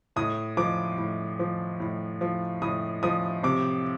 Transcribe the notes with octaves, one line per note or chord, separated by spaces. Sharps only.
A2 D#6
F3 D6
A2
F3
A2
F3
A2 D#6
F3 D#6
C3 D6